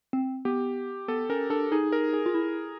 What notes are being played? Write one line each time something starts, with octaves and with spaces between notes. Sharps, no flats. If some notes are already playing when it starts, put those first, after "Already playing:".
C4
B3 G4
B3 A4
C#4 A#4
D4 A4
D#4 G#4
A#4
G#4
F4
E4